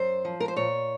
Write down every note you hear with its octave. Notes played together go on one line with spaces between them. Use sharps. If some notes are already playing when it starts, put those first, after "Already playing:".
Already playing: F#2 C5
F3
A#4
C5
A#2 C#5